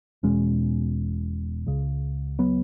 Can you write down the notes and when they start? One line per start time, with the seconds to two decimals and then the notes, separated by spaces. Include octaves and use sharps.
0.23 E1 E2 B2 G#3 C#4
1.67 C#2 C#3
2.39 F#3 B3